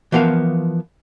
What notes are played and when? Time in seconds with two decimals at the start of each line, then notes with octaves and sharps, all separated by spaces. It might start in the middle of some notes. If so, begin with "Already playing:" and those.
0.12 E3 F3 B3 A#4 F5